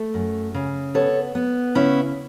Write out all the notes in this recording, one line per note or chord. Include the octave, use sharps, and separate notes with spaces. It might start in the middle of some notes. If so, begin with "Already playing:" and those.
Already playing: A3
F#2
C#3
B3 A4 C#5
B3
C#3 C#4 E4